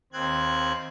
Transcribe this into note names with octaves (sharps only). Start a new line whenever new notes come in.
D#2 C4 F#6 G#6